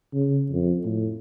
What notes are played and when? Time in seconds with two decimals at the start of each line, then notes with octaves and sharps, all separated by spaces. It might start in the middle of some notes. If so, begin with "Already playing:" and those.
0.14 C#3
0.52 F2
0.85 A2